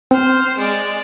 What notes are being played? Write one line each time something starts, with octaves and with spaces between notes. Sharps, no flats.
C4 C5 F6
G#3 D5